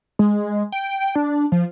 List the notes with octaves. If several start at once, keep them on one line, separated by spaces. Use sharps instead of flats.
G#3
G5
D4
F3